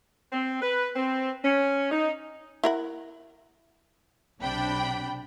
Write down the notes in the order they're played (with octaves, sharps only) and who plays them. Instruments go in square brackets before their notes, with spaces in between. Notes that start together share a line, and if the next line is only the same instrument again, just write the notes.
[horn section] C4
B4
C4
C#4
D#4
[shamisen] E4 A#4 F#5
[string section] B1 C3 D4 G5 B5